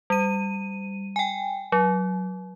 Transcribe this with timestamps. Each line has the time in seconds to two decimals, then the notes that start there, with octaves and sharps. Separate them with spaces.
0.10 G3 D#7
1.16 G5 G#5
1.72 F#3